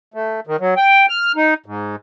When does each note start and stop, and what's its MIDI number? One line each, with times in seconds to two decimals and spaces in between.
0.14 0.40 57
0.47 0.56 51
0.60 0.74 54
0.77 1.06 79
1.09 1.32 89
1.36 1.54 63
1.66 1.96 44